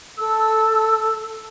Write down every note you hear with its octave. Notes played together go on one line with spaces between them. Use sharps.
A4 E6